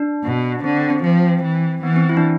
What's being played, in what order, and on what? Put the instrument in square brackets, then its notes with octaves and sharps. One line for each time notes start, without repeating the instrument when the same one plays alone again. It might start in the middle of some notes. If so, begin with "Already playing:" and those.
Already playing: [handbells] D4
[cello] B2
[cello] D3 [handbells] C4
[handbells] C4
C4
[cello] F3 [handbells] C4
[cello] E3
[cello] E3 [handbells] B3
[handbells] C4
E4
D4